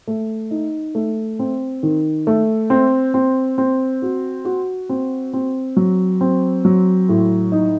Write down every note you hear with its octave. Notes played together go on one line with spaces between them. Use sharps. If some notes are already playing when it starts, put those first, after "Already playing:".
A3
D#4
A3
C4
D#3
A3
C4
C4
C4
F#4
F#4
C4
C4
F#3
C4
F#3
A2
D#4